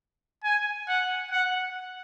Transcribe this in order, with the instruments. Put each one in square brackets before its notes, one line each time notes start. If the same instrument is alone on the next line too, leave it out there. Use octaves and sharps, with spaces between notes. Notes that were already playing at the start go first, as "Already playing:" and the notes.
[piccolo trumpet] G#5
F#5
F#5